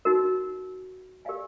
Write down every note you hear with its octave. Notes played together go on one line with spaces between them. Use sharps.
D#4 F#4 A#4
G4 A#4 D5 F5 G#5